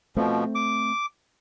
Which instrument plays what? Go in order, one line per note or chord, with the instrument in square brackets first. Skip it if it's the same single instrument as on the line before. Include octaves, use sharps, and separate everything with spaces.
[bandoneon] B2 F3 [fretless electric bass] A3 C4
[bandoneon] D6